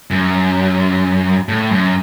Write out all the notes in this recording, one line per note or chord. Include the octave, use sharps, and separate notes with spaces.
F#2
A2
F#2